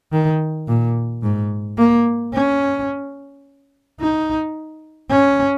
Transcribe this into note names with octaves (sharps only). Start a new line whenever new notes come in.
D#3
A#2
G#2
A#3
C#4
D#4
C#4